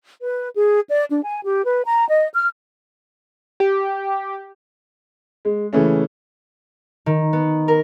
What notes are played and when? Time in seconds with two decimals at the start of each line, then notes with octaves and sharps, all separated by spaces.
0.23 B4
0.55 G#4
0.89 D5
1.10 D4
1.23 G#5
1.43 G4
1.66 B4
1.86 A#5
2.09 D#5
2.34 F6
3.60 G4
5.45 G#3
5.73 C#3 E3 A3 C#4
7.06 D#3
7.33 B3
7.68 A#4